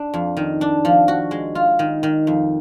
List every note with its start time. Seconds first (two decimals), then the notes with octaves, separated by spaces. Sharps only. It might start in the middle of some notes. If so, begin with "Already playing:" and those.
Already playing: D4
0.14 F2
0.37 D#3
0.61 D4
0.85 F3
1.08 F#4
1.31 G#3
1.55 F4
1.79 D#3
2.03 D#3
2.27 F2